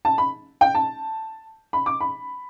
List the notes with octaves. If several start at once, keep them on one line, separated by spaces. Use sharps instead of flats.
A5
B5
G5
A5
B5
D6
B5